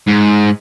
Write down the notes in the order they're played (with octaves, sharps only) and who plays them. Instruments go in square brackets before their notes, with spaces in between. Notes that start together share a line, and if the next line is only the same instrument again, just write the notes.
[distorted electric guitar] G#2